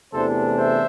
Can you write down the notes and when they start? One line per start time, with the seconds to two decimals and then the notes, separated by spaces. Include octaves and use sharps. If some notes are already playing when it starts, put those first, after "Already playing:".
0.13 E2 C3 E3 A3 D4 A4 C5
0.57 C5 E5